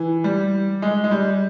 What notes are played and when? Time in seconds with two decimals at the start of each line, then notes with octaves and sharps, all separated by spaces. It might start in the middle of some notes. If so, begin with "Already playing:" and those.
Already playing: E3
0.24 G3
0.82 G#3
1.04 G#3
1.11 G3